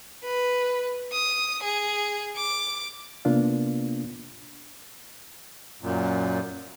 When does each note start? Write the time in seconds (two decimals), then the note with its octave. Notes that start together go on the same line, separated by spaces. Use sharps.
0.23 B4
1.12 D#6
1.63 G#4
2.36 D6
3.25 C3 A#3 B3 D4 F4
5.82 F#2 A#2